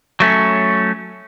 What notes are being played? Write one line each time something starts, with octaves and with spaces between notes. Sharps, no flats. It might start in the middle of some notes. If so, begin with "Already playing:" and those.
F#3 A3 C#4